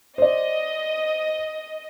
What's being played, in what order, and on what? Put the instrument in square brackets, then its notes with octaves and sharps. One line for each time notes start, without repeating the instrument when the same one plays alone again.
[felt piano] C5 D5 [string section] D#5